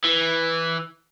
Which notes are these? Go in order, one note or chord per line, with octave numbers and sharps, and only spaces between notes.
E3